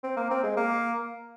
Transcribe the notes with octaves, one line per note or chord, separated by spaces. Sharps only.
C4
A#3
C4
G#3
A#3